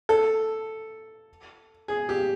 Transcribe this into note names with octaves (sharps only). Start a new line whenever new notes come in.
A4
G#4
G4